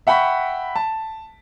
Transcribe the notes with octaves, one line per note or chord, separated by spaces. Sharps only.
E5 F#5 G5 B5 C#6 B6
A5